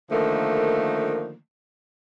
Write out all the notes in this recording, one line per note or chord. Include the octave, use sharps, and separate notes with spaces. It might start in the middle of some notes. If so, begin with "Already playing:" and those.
D3 D#3 F3 A3 A#3